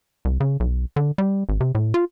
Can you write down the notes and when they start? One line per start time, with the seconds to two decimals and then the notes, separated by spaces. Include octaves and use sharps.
0.25 C2
0.40 C#3
0.60 B1
0.96 D3
1.18 G3
1.49 G#1
1.60 C3
1.75 A2
1.94 F4